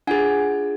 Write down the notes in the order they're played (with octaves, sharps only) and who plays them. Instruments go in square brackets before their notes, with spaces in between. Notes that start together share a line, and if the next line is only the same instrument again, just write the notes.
[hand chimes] D4 F4 G#4 F#5 G#5